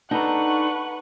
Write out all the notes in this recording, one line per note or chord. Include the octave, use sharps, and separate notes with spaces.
D4 D#4 A4 B4 F#5 A#5 C#6